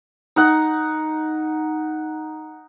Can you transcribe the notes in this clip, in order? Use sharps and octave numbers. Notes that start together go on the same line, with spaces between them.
D#4 F#5